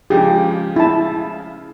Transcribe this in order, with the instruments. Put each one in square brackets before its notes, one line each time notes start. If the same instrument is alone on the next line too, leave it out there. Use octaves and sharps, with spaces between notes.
[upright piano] C#3 F3 G#3 [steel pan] G4
[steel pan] E4 A5